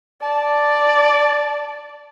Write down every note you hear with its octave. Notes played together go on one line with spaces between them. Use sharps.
D5 A5